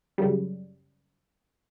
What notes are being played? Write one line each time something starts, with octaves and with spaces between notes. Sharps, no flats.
F#2 C#3 G3